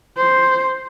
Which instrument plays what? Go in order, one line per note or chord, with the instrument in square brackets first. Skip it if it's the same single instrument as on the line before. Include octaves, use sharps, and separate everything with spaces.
[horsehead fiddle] C5